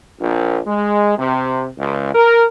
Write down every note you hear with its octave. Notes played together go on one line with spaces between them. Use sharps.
A#1
G#3
C3
C#2
A#4